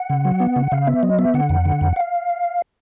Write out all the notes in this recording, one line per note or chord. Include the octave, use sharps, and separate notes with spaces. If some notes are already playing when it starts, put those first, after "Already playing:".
Already playing: F#5
C#3
F#3
B3
C#3
C#3 F5
B3 E5
F#3 D#5
B3 E5
D3 F#5
F2
D3
F2
F5